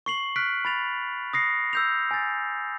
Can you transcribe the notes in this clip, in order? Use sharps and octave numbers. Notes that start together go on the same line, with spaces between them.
C#6 C7 F#7
F6 F#6 B6 D7
B5 A6 F7
D#6 A#6 C7 C#7
E6 G6 F7
G#5 A6